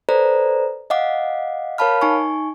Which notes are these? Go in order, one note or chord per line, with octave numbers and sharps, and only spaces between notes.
A4 B4 C5 D5 A#5
D#5 F5 F#5 D6
A#4 C#5 F5 A5 B5 F6
D#4 G#5 C#6